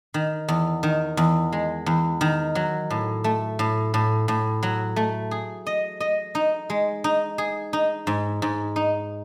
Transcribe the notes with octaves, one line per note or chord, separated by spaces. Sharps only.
D#3
E2
D#3
E2
G#3
E2
D#3
F#3
A2
A3
A2
A2
A2
F#3
A3
G#4
D#5
D#5
D#4
G#3
D#4
G#4
D#4
G#2
G#2
D#4